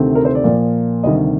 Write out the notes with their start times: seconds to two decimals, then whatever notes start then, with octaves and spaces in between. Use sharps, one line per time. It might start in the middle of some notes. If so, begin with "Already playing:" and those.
Already playing: D2 C3 D#3 A3 C4
0.15 A#4
0.25 C5
0.35 D5
0.44 A#2 F3 A#3
1.03 D2 C3 D#3 G3 D#5